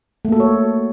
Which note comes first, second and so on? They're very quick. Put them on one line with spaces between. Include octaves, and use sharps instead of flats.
A3 A#3 A4 F#4 C#5